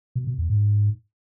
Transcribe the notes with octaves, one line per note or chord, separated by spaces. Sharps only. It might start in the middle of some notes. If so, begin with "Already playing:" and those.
B2
B2
E2
G#2